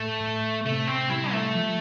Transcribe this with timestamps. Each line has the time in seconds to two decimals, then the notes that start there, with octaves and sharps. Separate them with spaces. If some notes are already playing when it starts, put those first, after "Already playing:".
Already playing: A2 A3
0.21 A2
0.65 C3 A3
0.88 C4
1.10 G3 E4
1.32 A3
1.55 F3